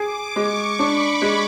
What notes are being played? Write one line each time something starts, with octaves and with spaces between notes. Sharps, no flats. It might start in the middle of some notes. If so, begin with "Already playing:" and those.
Already playing: G#4 D6
G#3 C#6
D4 B5
G#3